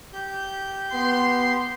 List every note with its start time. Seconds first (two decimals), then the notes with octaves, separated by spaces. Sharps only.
0.13 G4 G6
0.94 B3 C6